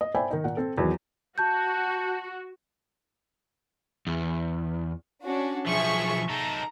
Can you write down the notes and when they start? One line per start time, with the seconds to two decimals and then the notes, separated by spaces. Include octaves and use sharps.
0.01 D#5
0.15 C5 D5 E5 G5 G#5 B5
0.30 D#3 D#4
0.44 A#2 F#5
0.57 C4 A4
0.78 E2 D#3 F#3
1.38 F#4 A5 G6
4.07 E2
5.24 C#4 D4 F#4
5.67 B1 F3 G#4 E5 C#6
6.29 D#4 A4 A#5